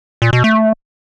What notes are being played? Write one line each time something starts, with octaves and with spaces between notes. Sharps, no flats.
A#2
B2
A3